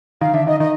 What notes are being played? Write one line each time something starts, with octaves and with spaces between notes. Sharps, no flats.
D#3 F5
D3 E5
D#3 D#5
D#3 D#5